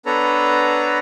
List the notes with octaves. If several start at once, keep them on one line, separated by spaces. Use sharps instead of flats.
B3 D4 A4 B4 C#5 A#5